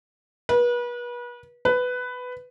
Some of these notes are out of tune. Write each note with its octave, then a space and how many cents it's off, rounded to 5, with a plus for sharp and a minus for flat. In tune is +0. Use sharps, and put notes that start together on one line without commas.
B4 -35
B4 +10